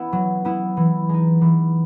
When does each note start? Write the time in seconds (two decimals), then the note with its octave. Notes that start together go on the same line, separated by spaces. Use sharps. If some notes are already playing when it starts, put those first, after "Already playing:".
Already playing: B3 E4
0.13 F#3
0.45 B3 E4
0.77 E3
1.09 G#3 D#4
1.41 E3